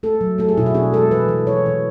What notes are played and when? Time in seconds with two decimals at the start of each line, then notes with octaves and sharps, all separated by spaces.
0.03 A3 A4
0.21 F#3
0.38 A3 A4
0.49 G#4
0.57 B2 E4
0.66 F#4
0.74 D4 G#4
0.93 G#3 A4
1.11 E3 B4
1.29 E3
1.47 E3 C#5
1.66 E3